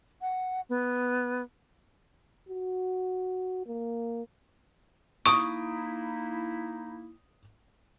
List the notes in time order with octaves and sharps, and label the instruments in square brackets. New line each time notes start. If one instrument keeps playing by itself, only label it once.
[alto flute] F#5
B3
[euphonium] F#4
A#3
[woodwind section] A#3 D#4 E4 [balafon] C#6 [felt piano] D#6 D7